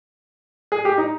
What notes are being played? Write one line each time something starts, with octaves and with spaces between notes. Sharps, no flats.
G#4
G4
D#4